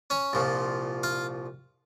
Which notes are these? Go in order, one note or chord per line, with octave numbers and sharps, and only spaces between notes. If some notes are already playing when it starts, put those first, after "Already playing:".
C#4 C#5
C2 A#2 F3
F4 F5